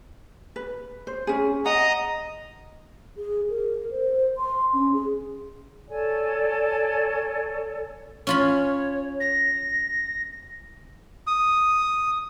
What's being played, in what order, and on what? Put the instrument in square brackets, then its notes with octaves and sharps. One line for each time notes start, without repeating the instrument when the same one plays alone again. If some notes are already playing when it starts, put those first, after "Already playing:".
[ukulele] B4
C5
C#4 G#4
[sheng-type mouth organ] D#5 A#5 D#6 [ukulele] F#5
[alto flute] G#4
A#4
C5
C6
C#4
G#4
[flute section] A4 C#5 D5 G#5
[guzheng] C#4 F4 B5 [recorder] C#5
[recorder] A#6
[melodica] D#6